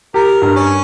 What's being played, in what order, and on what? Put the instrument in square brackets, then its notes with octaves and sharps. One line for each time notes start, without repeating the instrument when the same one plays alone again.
[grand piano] G4 [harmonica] A#4
[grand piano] G2
[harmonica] C#4